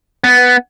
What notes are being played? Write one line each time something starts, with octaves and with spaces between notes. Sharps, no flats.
B3